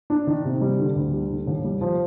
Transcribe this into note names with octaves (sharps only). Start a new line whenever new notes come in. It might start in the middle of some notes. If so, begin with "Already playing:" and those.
D4
D#3
C3
G3
D3
D2
G3
D3
D#2
G3
F3